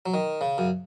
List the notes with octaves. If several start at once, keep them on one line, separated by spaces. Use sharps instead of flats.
F#3
D#3
C#3
F#2